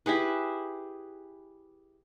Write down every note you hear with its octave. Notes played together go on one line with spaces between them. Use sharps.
E4 G4 G#4 B4